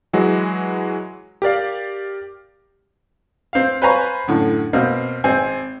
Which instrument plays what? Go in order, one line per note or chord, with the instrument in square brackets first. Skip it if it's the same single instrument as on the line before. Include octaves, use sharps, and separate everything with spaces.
[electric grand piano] E3 F#3 G#3 F#4
G4 A#4 D5 F5
[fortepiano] C4 F5
B4 C5 F5 G#5 A#5 C#6
F#2 A2 D3
B2 A#3 C4
G#1 C4 G#5